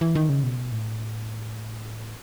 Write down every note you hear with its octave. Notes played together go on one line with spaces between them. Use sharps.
E3
D#3
C#3
B2
A2